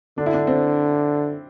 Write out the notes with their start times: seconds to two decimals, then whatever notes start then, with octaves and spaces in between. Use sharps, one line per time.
0.18 D3 D4
0.26 E4
0.34 D4
0.47 C4